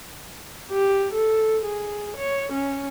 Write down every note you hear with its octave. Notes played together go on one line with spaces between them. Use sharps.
G4
A4
G#4
C#5
C#4